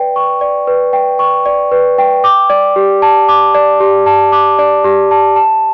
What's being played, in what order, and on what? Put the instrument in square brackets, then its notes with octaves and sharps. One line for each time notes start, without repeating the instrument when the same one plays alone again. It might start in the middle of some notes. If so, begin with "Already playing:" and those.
Already playing: [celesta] B4 D5 G5
C#6
D5
B4
G5
C#6
D5
B4
G5
D6
D5
G4
A5
D6
D5
G4
A5
D6
D5
G4
A5
A5